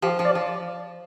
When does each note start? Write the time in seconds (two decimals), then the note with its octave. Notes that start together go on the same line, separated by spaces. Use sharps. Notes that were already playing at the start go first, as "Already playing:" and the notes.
0.02 F3 G4
0.19 F3
0.25 D5
0.35 F3